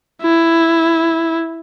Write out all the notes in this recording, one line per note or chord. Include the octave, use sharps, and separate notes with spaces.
E4